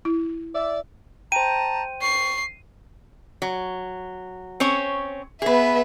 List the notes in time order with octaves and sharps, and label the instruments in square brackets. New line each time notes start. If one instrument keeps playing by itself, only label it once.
[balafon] E4
[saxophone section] D5 E5
[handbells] C5 G5 [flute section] A5 A#5 [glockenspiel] D#7
[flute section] C#6 [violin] C7
[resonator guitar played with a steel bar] F#3
C4 C#4 C#5
[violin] B3 E5 [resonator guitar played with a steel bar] G#4 B4